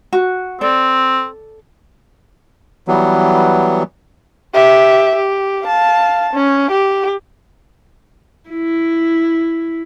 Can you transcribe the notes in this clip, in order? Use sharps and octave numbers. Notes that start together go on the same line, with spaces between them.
F#4
C4 A4 D5
E3 F#3 G3 B3
G4 E5
G4
F5 A5
C#4
G4
E4